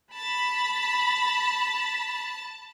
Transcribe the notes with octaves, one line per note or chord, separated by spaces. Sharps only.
A5 B5